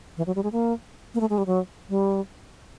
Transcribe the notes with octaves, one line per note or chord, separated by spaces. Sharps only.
E3
F#3
G3
G#3
A#3
A#3
A3
G#3
G3
F#3
G3